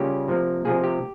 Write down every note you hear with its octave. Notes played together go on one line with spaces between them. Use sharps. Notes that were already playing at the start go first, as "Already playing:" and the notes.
Already playing: C#3 G3 A#3 C#4 F4 G4
C3 F3 A#3
C3 F3 A#3 G#4
G4